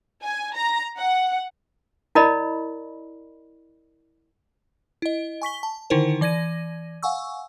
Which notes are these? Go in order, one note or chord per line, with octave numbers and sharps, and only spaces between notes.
G#5
A#5
F#5
E4 A#4 D5 D#5 B5
E4 D#5
G#5 C#6 B6 G7
A5
D3 D#3 D#4 E4 A#4 C5
E3 D5 G#6 A#6 D#7
F5 F#5 G#5 C#6 E6